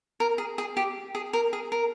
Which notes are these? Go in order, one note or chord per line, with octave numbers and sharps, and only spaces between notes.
A#4
G#4
G#4
G4
G#4
A#4
G#4
A#4